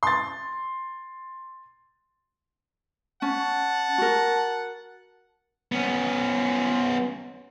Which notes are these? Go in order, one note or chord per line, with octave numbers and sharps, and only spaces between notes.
C6 A6
C#4 F#5 A5
F#4 A#4
B3 C#4